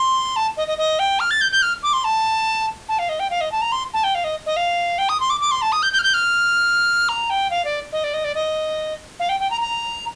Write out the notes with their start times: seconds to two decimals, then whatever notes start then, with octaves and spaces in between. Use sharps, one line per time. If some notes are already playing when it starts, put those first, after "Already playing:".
Already playing: C6
0.36 A5
0.57 D#5
0.68 D#5
0.78 D#5
0.99 G5
1.20 F6
1.31 A6
1.41 G6
1.52 G6
1.62 F6
1.83 D6
1.93 C6
2.04 A5
2.89 A5
2.99 F5
3.09 D#5
3.20 G5
3.30 F5
3.41 D#5
3.52 A5
3.62 A#5
3.72 C6
3.93 A5
4.04 G5
4.15 F5
4.24 D#5
4.46 D#5
4.56 F5
4.98 G5
5.09 D#6
5.20 C6
5.30 D6
5.41 D6
5.51 C6
5.62 A5
5.72 D#6
5.83 G6
5.93 G6
5.99 F6
6.03 G6
6.14 F6
7.09 A#5
7.30 G5
7.50 F5
7.65 D5
7.92 D#5
8.04 D5
8.14 D#5
8.24 D5
8.35 D#5
9.20 F5
9.29 G5
9.40 G5
9.50 A#5
9.61 A#5